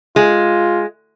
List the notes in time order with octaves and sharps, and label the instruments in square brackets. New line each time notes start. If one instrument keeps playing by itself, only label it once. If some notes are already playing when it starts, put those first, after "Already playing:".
[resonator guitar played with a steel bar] G#3 [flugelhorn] F4